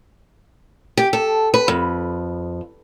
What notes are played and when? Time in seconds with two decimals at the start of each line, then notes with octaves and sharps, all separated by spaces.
0.97 G4
1.13 A4
1.54 B4
1.68 F2